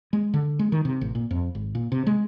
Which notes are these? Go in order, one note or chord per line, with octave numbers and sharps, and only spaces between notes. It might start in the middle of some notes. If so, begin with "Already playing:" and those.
G#3
D3
G#3
D#3
C3
A1
A#2
F2
G#1
A#2
C3
G#3